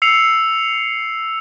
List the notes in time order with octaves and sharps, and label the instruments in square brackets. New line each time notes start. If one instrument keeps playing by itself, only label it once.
[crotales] E6 C7 C#7 F7